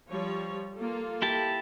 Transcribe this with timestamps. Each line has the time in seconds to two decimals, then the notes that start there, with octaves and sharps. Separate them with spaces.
0.10 F3 G3 C#5
0.76 A#3 F4 A4
1.22 E4 G4 A5